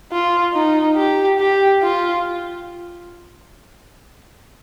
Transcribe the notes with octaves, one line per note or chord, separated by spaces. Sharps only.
F4
D#4
G4
G4
F4